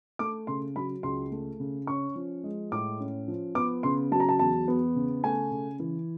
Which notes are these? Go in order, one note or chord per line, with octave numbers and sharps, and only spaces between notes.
A3 D6
C#3 C6
F#3 B5
C#2 C6
A3
C#3
C#4 C#6
F3
G#3
A2 D6
C#4
F3
B3 D6
C#3 C6
F#3 A5
A#5
A5
E2 A5
B3
C#3
A3 G#5
C#3
E3